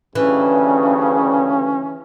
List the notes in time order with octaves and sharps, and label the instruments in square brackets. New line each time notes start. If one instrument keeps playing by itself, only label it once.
[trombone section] D2 G2 C#3 [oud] E3 [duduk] C#4